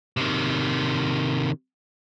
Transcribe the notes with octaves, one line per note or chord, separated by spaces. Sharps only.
C3 D#3